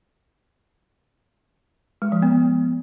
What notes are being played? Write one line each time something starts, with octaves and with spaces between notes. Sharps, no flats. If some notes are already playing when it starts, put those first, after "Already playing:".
G#3
F3
B3